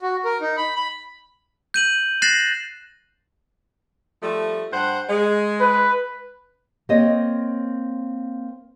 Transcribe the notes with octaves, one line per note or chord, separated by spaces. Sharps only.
F#4
A#4
D#4
B5
B5
G6 D#7 F#7
F#6 A6 A#6 C7 E7 F#7
F3 G3 A3
G2 C5 F#5
G#3
B4
A#3 C4 C#5 D#5